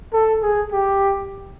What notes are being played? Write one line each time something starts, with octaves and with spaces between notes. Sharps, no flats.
A4
G#4
G4